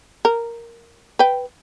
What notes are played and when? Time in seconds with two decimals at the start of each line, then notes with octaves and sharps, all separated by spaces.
0.25 A#4
1.19 B4 G5